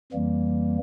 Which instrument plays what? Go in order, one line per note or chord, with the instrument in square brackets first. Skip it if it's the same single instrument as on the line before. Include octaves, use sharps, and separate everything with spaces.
[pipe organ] F2 E3 G3 A#3